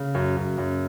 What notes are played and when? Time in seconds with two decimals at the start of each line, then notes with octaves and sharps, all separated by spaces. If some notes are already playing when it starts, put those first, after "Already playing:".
Already playing: C#3
0.15 F#2
0.37 F#2
0.58 F#2